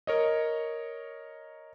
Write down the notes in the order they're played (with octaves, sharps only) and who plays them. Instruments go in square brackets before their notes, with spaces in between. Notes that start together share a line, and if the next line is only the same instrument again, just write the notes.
[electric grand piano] A#4 C#5 D#5